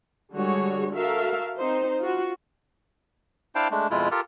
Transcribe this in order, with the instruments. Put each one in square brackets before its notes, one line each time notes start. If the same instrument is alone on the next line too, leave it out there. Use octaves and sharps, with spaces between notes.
[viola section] D3 G3 G#3 F#4 G#4 C#5
F#4 A4 A#4 E5 F5
C4 D#4 C5
F4 F#4
[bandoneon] D4 E4 C5 F5 G5 A5
G#3 A3 D4
F2 B2 G#3 E4 F4
F4 G4 A4 A#4